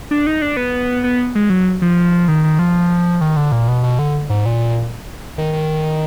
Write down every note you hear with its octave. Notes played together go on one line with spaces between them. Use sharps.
D4
D#4
D4
B3
B3
G#3
F#3
F3
D#3
D#3
F3
D#3
D3
A#2
B2
B2
D3
G#2
A#2
D#3
D#3